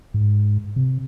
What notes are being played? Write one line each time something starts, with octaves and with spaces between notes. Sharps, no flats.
G#2
C3